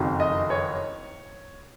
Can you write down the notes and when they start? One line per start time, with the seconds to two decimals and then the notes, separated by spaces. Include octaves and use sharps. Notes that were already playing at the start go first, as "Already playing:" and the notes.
Already playing: F#1 F2 D#3 F#3
0.20 D#5
0.50 C#5